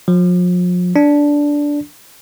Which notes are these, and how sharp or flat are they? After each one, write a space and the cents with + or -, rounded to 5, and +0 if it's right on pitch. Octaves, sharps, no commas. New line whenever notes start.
F3 +40
D4 -10